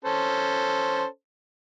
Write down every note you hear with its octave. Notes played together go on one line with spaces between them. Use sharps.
C#4 A4 C5